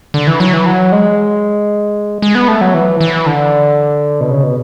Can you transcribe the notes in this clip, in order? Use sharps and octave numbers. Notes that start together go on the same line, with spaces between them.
D3
E3
F#3
E3
F#3
G#3
G#3
B3
A3
F#3
E3
E3
D3
B2
C#3
B2